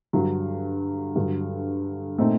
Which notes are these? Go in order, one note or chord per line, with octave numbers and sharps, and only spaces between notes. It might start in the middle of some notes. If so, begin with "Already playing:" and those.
G2 D3 F#3
G2 D3 F#3
A#2 A3 C4 D#4